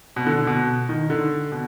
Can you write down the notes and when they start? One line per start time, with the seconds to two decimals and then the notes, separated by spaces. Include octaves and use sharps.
0.16 B2
0.27 D3
0.47 B2
0.89 D#3
1.10 D3
1.52 B2